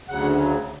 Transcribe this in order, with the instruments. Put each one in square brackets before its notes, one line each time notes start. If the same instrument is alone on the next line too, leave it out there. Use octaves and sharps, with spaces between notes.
[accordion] D2 C#3 F#3 F#5